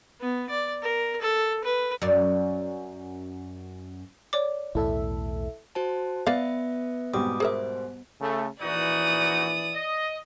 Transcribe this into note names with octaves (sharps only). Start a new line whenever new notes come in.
B3
D5
A#4
A4
B4
F#2 D5
C#5 D5 D6
B1 E2 A2 E4 A4 E5
F#4 C5 A5
B3 B4 D5 E5 F5
G#2 B2 G3 C4 D6 D#6
G#4 A#4 C5 E5
C#3 A3
A#1 E3 D#4 F#4 D5 D#6
D#5